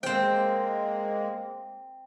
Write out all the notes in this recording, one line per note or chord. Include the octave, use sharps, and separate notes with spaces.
G#3 A#3 C4 C5 G5